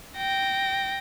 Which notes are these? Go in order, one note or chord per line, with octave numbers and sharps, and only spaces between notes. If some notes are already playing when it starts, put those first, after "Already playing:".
G5 A#6